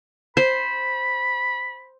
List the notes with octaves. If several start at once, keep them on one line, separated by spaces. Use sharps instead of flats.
C5 B5